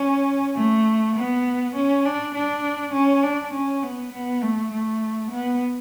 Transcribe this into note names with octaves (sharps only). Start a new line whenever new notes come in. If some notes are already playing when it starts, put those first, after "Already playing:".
Already playing: C#4
A3
B3
C#4
D4
D4
C#4
D4
C#4
B3
B3
A3
A3
B3